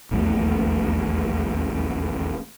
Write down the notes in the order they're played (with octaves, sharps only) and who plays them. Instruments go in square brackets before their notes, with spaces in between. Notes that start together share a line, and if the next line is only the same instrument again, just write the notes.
[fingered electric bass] D#1 A#1 E2 A3